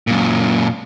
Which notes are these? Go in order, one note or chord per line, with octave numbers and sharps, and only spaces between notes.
F#2 A#2